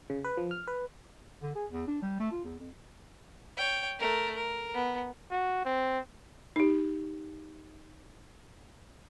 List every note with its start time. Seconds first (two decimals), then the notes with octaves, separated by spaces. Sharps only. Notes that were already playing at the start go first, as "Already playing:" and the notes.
0.10 C#3
0.24 B4
0.37 F3
0.51 F6
0.67 B4
1.43 D3
1.55 G#4
1.71 E2
1.87 D4
2.02 G3
2.20 A3
2.32 F4
2.44 E2
2.60 F2
3.57 C#5 G5
3.99 A3 A#4
4.36 A#4
4.74 B3
5.31 F#4
5.65 C4
6.56 D#4 G4